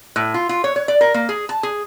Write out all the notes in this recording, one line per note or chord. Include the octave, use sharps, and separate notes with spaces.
A2
F4
F4
C#5
C#5
D5
A#4
A#3
G#4
A5
G#4